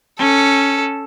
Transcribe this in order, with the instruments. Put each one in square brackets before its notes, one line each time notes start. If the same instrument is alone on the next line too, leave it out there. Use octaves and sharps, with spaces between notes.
[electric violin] C#4 [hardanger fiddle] A4